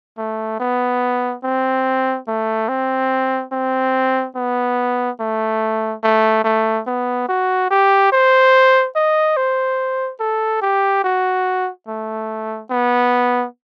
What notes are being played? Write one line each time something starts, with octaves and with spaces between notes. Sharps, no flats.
A3
B3
C4
A3
C4
C4
B3
A3
A3
A3
B3
F#4
G4
C5
D#5
C5
A4
G4
F#4
A3
B3